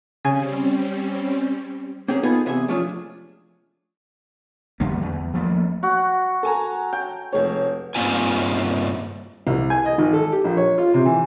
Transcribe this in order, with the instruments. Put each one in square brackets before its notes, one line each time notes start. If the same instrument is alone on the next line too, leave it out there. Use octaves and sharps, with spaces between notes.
[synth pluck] C#3 G#5 [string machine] G3 C4 C#4
[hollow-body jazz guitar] A#3 C4 C#4 G#4
B3 D#4 F4 G#4 A4 B4
E2 C3 B3 G#4 E5
F3 A3 C#4 D4 F4 G#4
[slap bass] F2 D3 G3 A#3
E2
F3 F#3 A3 A#3
[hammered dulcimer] F#4
[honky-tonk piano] A4 G#5 A#5
[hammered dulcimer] G5
[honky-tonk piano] F1 G#3 C#5
[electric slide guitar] G2 C#3 A#3 C4 F4 G#5
[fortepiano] C2
G#5
D#5
G#1
A4
G4
A#1
C#5
F4
C3
E3